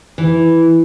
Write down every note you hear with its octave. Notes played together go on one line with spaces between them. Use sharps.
E3